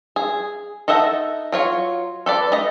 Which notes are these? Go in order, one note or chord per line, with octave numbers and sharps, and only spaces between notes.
G#4
D#4 A4 D#5 E5 F#5
F#3 F4 C#5
A4 B4 D5
A3 D#5